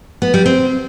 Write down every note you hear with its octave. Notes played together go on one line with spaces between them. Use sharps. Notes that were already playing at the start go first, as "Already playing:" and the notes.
B3
G3
C4